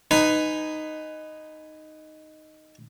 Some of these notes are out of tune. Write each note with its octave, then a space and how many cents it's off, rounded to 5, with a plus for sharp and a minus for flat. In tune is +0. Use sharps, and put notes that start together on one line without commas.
D#4 -5 B4 +15 G#5 +0